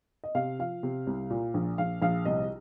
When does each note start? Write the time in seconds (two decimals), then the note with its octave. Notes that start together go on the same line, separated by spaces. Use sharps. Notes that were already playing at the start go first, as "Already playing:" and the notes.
0.24 D#5
0.35 C3 F5
0.59 F3 F5
0.83 C3
1.07 C2
1.30 A#2
1.54 A#1
1.78 A#1 F5
2.02 A#1 F5
2.25 C2 D#5